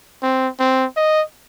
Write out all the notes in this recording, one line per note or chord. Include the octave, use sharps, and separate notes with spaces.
C4
C4
D#5